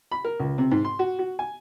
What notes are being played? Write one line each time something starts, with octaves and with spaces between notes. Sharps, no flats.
B5
A#4
C#2
C3
G#2
C6
F#4
F#4
G#5